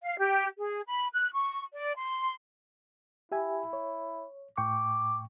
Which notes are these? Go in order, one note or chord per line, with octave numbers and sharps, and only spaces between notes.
F5
G4
G#4
B5
F#6
C#6
D5
C6
E4 G4 E5 G#5
C#5
A2 G5 C#6 D6